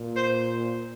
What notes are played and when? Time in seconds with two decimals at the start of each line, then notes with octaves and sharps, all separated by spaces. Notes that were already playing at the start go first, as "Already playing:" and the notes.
Already playing: A#2
0.16 C5